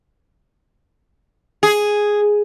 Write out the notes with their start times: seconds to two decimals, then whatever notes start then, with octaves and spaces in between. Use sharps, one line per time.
1.63 G#4